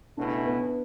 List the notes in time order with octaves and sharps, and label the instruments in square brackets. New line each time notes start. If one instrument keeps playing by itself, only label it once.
[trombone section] C#2 B2 A3 C#4 E4 [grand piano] D4
[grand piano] B3